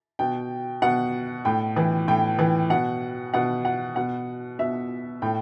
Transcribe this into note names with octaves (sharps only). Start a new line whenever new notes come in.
B2 G5
B2 F#5
A2 G5
E3
A2 G5
E3
B2 F#5
B2 F#5
F#5
B2 F#5
B2 E5
A2 G5